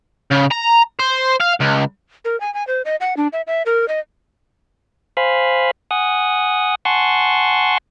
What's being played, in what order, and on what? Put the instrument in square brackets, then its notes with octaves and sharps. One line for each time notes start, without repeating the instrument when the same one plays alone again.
[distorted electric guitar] C#3
A#5
C5
F5
C#2
[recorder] A#4
G#5
G#5
C5
D#5
F#5
D4
E5
E5
A#4
D#5
[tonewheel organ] C5 F5 G#5 B5
F#5 G#5 D#6
F#5 G#5 A5 C6 C#6